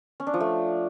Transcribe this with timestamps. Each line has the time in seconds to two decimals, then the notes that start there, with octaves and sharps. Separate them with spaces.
0.20 C#4
0.27 D4
0.34 F3
0.40 A3